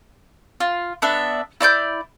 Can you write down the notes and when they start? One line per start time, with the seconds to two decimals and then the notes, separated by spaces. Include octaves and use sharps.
0.60 F4
1.02 B3 D4 E5
1.61 E4 D5 C6 G6